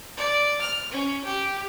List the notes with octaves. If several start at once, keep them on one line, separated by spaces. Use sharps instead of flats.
D5
F6
C#4
G4